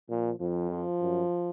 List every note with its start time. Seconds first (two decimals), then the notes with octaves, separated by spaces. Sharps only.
0.10 A#2 F3
0.40 F2 F3
0.70 F3
1.01 F#2